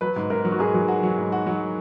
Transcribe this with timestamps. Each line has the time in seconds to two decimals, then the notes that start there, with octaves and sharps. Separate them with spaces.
0.01 F#3 B4
0.16 G#2
0.30 G#2 A#4
0.45 F#3
0.52 F#4
0.59 G#2 G#4
0.74 F#3
0.88 F#4
1.03 F#3
1.18 G#2
1.32 F#4
1.47 F#3